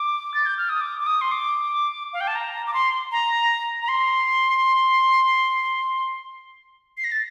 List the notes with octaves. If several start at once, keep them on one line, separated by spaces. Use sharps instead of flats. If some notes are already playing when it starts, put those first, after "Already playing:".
Already playing: D6
A6
G6
F6
D#6
D6
D6
D#6
C6
D6
F5
G5
A5
A#5
D6
C6
A#5
A#5
C6
C7
A#6
A6